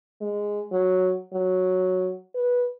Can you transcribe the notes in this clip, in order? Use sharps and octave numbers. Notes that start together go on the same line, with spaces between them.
G#3
F#3
F#3
B4